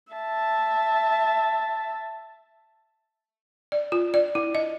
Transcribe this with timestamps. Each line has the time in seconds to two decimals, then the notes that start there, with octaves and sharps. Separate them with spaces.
0.13 E5 A5
3.72 D5
3.92 F4
4.14 D5
4.35 E4
4.55 D#5